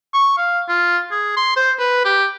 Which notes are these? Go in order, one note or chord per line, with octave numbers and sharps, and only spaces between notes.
C#6
F5
F4
G#4
C6
C5
B4
G4